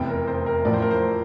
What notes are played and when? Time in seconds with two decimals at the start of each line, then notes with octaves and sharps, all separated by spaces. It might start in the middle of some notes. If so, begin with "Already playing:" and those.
Already playing: F1 E2 C3 G5
0.09 A#4
0.27 C5
0.46 A#4
0.65 A1 A2 F3 D5
0.73 C5
0.82 A#4
0.91 C5